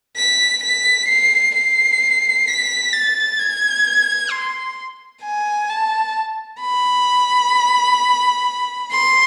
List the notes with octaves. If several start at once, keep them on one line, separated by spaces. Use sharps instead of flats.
B6
B6
C7
C7
B6
A6
G#6
C6
G#5
A5
B5
C6